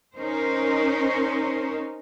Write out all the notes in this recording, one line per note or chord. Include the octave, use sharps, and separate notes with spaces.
C#4 D#4 A#4 C5